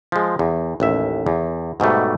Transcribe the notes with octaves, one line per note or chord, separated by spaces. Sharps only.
F3 G#3
E2
A1 D#2 E5
E2
G#2 B2 G3 A3